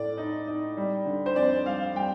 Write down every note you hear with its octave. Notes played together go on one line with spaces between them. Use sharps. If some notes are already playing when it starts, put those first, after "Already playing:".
Already playing: A2 A3 D5
D#4
D#4
G3
D3
C5
F2 D5
G3 F5
G3 G5